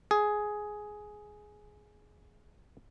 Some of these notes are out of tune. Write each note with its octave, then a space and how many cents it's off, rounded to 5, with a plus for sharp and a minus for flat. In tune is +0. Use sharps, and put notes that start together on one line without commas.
G#4 +10